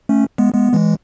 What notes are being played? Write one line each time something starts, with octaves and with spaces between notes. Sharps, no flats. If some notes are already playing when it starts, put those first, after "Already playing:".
A3 C#4
G#3 B3
G#3 B3
E3 G#3